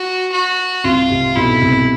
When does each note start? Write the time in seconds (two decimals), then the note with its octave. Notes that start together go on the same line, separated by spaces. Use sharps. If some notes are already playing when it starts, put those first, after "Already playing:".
Already playing: F#4
0.32 F#4
0.84 C2 C3 F4
1.10 C2 C3
1.36 B1 B2 E4
1.61 C2 C3